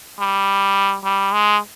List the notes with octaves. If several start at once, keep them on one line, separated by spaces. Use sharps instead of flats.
G3
G3
G#3